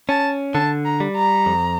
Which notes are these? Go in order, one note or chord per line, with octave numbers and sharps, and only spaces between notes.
C#4 A5
D3 A5
A#5
G3
A#5
F2